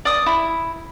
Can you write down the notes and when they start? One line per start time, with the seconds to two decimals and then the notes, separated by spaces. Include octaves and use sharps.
0.05 D5 D#6
0.26 E4